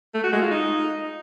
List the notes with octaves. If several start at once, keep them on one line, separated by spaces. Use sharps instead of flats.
A3
F#4
G#3
F4
D#4